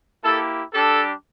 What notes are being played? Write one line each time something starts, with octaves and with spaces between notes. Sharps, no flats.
A#3 E4 G4 A4
G3 D4 G4 A4